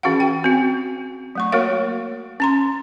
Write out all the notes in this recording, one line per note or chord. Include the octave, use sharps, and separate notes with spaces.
E3 C#4 F#4 G#4 F5 F#5
G5
C4 F#4
F#3 A3 C#6
A#3 F#4 A#4 C#5 F5
C#4 A#5 C6